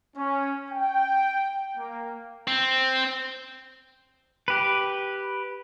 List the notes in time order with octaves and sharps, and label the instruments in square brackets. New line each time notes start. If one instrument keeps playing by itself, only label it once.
[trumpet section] C#4
G5
A#3
[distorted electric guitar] C4
[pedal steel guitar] G4 B4